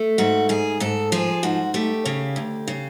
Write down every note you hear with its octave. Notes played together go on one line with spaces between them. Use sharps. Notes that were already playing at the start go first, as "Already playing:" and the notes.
Already playing: A3
G#2 F#4
G#2 G#4
G#2 A4
F3 G#4
G#2 F#4
A3 G4
C#3
D2
C#3